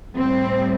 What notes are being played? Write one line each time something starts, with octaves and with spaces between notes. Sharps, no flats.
A2 G3 C4